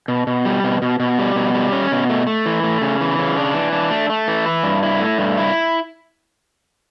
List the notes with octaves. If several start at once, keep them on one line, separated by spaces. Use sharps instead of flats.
B2
B2
G3
B2
B2
B2
G3
B2
G3
C#4
B2
A3
A3
E3
A3
C#3
E3
C#3
D4
E3
D4
A3
A3
E3
E4
G2
E4
A3
G2
E4